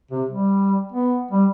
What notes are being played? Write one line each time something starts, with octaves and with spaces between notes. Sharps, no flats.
C3
G3
B3
G3